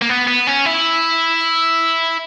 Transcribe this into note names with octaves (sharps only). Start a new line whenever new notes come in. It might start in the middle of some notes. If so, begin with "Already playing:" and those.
A#3
B3
B3
C#4
E4